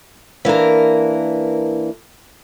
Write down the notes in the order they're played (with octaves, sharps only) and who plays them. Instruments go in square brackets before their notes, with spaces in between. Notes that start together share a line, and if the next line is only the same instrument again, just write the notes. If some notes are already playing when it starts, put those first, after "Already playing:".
[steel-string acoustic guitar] E3 A#3 D4 A#4